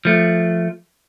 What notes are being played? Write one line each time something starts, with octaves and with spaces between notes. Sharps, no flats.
F3 A3